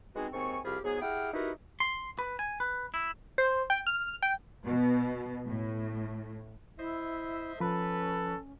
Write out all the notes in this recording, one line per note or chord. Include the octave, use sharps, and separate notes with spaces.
G#3 B3 C4 D#4 F#4 G#4
D#2 G#2 C4 G#5 C#6
C2 F3 G4 G#4 B5 F6
G#2 F#3 B3 G#4
E4 G4 G#4 F#5 G5 F6
D#4 E4 F#4 G4 A#4 B4
C6
B4
G#5
B4
E4
C5
G5
F6
G5
B2
A2
E4 C5 D#5 E5
F3 C#4 A4 B4 B5